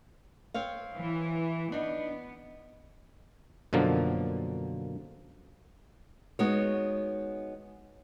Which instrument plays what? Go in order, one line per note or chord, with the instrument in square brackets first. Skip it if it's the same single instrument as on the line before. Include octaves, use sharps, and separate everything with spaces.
[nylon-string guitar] C4 C#5 F5
[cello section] E3
[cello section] B3 [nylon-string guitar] D4 D#4
[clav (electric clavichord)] F#2 B2 D3 F3 A#3
[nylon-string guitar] G#3 B3 D#4 F#4 C#5